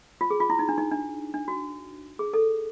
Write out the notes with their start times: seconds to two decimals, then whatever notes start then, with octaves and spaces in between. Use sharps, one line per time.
0.21 F4
0.31 G#4
0.40 F4
0.50 E4
0.59 D#4
0.69 D4
0.78 D#4
0.91 D4
1.34 D4
1.48 F#4
2.19 G#4
2.34 A4